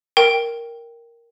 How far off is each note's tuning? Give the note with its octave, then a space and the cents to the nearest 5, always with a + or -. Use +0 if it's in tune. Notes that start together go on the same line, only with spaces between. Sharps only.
A#4 +0 G5 +0